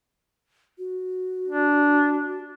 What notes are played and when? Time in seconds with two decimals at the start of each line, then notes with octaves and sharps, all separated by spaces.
0.78 F#4
1.47 D4